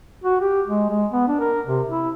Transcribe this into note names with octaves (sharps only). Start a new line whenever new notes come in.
F#4
G4
G#3
G#3
B3
D4
A#4
C3
E4